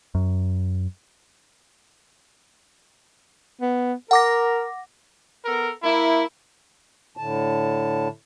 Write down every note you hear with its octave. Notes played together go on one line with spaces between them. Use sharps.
F#2
B3
A#4 F#5 D6 A#6
B3 A4 A#4
A#3 E4
A2 D3 A5